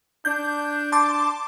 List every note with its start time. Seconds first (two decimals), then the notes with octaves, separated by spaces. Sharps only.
0.25 D4 G6
0.92 A5 C6 D6